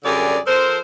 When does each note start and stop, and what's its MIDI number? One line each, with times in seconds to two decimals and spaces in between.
0.04 0.38 42
0.04 0.38 50
0.04 0.38 55
0.04 0.38 68
0.04 0.38 70
0.04 0.38 74
0.46 0.78 53
0.46 0.78 69
0.46 0.78 70
0.46 0.78 72